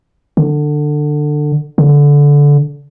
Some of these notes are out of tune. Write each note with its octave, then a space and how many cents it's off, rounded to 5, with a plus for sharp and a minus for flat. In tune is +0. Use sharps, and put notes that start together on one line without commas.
D3 +20
D3 -20